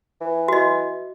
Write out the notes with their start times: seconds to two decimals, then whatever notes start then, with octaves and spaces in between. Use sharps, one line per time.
0.21 E3
0.48 F#4 D#5